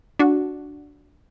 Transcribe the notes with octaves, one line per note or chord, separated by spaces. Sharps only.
D4 F#4